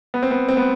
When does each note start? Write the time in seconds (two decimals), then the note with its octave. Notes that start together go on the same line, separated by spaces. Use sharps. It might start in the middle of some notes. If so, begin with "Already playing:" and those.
0.14 B3
0.23 C4
0.31 B3
0.49 C4
0.57 B3